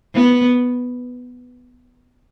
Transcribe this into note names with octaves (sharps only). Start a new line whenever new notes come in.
B3